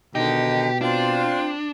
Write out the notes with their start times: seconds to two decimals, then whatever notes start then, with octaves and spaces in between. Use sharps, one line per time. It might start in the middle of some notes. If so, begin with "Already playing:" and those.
0.15 B2 D3 D#3 D#4 G4
0.81 C4 D4 F4